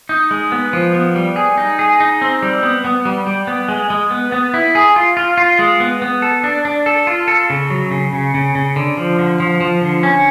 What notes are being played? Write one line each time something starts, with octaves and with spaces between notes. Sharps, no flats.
D#4
G#3
B3
F3
B3
G3
G#4
D#4
G#4
D#4
C4
G3
B3
B3
G3
G3
B3
G#3
G#3
B3
B3
E4
G#4
F4
F4
F4
G#3
B3
B3
A4
D4
D4
A4
F4
A4
C#3
F#3
C#3
C#3
C#3
C#3
D3
F3
D3
F3
F3
D3
C#4